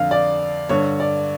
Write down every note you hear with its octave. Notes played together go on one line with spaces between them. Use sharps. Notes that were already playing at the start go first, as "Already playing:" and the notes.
Already playing: F2 D3 F5
D5
G2 D3 C#5
D5